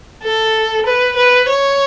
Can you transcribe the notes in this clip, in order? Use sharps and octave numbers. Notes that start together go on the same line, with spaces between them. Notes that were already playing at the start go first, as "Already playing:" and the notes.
A4
B4
B4
C#5